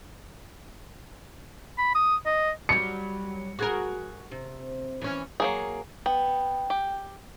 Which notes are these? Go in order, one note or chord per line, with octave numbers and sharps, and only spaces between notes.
B5
D#6
D#5
F#3 G3 C#7
F#4 G#4 A#4
C3
E3 C#4
F#3 A#3 G#4
B3 G5
G4